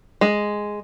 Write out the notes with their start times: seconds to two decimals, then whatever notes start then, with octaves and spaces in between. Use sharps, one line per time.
0.21 G#3